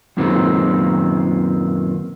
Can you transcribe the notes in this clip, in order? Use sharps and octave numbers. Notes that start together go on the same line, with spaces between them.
F#2 A#2 D#3 B3 C4